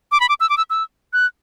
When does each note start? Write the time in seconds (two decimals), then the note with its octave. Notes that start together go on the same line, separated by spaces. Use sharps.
0.12 D6
0.20 B5
0.29 D6
0.40 E6
0.50 D6
0.57 E6
0.70 E6
1.13 F#6